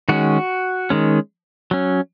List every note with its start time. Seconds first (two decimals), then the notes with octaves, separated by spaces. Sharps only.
0.09 D#3 G#3 C#4 F#4
0.90 D#3 G#3 C#4
1.71 F#3 C#4